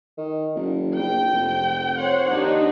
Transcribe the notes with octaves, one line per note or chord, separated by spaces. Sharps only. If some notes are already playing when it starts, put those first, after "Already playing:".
D#3
F#1
A#1 G5
F1
C5 C#5 F#5
D#2 D4 D#4